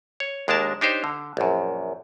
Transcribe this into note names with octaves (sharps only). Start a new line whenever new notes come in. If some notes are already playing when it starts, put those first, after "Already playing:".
C#5
D#2 G#3 D4 A#4 A5
D4 D#4 G4 C5 C#5
D3
A#1 F#2